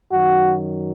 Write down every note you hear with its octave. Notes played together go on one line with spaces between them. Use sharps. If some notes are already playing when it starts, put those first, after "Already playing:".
F#2 D#3 F#3 F#4